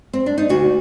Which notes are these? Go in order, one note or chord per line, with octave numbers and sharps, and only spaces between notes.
C4
D4
D#4
D2 F#4